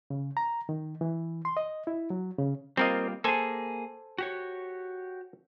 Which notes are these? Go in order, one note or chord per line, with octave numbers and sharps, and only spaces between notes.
C#3
A#5
D#3
E3
C6
D#5
E4
F#3
C#3
G3 A#3 C4 F4 A#4 D#5
A#3 G#4 A4 C5 G#5
F#4 G4 C#5